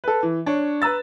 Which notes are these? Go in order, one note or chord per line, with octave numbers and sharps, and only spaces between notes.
A4 B4
E3
D4 C#5
B4 A#5 E6 A6